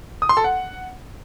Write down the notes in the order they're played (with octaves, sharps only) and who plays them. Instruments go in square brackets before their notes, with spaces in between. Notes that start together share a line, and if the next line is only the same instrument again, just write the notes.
[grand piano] D#6
C6
A4
F#5